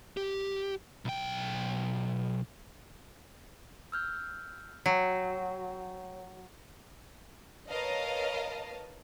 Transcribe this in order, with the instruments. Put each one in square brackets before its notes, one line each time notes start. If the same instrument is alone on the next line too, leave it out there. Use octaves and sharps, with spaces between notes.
[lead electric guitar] G4
B1 G5
[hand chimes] E6 F6 G6
[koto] F#3 [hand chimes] C#5 G5
[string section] A#4 B4 C#5 D#5 F5 A5